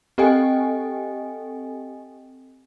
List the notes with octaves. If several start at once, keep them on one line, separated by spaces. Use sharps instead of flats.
C4 G4 A4 D#5 G5 G#5